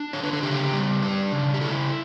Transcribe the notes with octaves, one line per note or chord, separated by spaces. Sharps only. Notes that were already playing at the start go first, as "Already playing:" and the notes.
Already playing: D4
D3 C#5
B4
A4
C#3 G4
G3
D4
C#3
G4
E4 A4